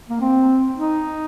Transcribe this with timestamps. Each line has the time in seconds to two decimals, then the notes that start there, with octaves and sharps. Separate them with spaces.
0.10 A#3
0.21 C4
0.77 D#4